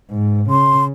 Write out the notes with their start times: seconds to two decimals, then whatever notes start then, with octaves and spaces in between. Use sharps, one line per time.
0.11 G#2
0.50 C#3 C6